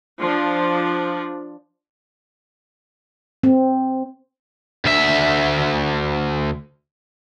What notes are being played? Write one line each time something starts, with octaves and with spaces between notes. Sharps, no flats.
F3 D4
C4
D2 E5